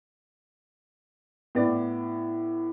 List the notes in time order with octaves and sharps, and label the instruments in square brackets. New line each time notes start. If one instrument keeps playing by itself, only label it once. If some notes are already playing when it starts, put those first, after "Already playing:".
[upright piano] A2 B3 D5